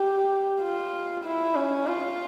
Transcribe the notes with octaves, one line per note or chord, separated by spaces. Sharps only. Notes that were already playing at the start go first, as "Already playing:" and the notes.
Already playing: G4
F4
E4
C#4
F4